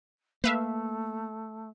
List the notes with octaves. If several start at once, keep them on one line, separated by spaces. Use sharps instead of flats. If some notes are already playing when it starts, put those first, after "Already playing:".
A3 A#3 B4 E5 F5